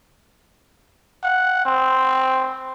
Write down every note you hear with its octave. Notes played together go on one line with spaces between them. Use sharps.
F#5
C4